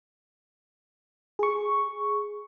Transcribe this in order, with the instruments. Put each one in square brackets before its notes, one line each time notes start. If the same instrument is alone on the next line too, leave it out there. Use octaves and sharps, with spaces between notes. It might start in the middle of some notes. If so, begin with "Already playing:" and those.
[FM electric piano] G#4 C#6